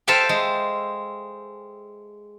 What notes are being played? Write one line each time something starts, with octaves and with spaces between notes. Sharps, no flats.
A4 C5 E5 F5 G5 G#5
G#3